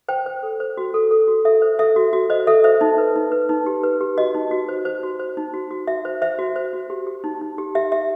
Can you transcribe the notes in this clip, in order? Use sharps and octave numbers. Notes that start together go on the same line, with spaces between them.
C5 G5
C5
A4
C5
F#4
A4
A4
F#4
A4 E5
C5
A4 E5
F#4
F#4
C5 D#5
A4 E5
C5 E5
D#4
B4
D#4
B4
D#4
G4
B4
G4
F#4 D#5
D#4
F#4
C5
C5
F#4
C5
D#4
F#4
F#4
F#4 E5
C5
C5 E5
F#4
C5
F#4
G4
G4
D#4
D#4
G4
G4 E5
G4 E5